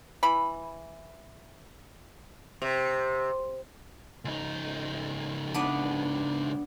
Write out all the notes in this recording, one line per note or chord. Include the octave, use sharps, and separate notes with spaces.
E3 B5
C3
C#2 D#4
B3 D4